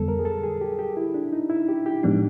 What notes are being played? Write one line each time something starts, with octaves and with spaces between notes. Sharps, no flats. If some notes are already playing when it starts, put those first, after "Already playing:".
Already playing: F2 D3 G3 B3 A4
A#4
G#4
A4
G#4
G4
G4
E4
D4
D#4
E4
G4
G4
A2 F3 G#3 B3 D4 D#4